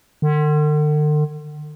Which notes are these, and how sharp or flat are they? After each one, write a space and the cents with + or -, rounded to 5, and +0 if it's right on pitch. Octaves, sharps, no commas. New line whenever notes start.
D3 +45